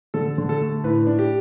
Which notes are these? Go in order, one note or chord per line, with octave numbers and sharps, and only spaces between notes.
D3 A4
D3
A4
A3
A2 B4
D4
G4